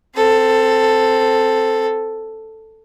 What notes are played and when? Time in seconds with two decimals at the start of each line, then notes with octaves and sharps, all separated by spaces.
0.16 C4 A4